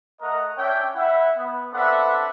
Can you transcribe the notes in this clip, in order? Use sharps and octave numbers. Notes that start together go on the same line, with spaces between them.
A3 A#4 D#5 F#5 A#5
C#4 D4 C#5 E5 G5
E4 E5 F#5
B3
C4 D4 A4 B4 E5 F#5